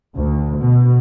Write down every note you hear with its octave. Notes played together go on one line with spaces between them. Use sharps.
D2
B2